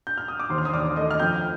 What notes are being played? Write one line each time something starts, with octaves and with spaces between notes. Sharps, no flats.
G6
F6
D#6
D6
D#2 C5 C6
F6
D#6
D#2 D5 D6
A3 D#5 D#6
F6
F2 G5 G6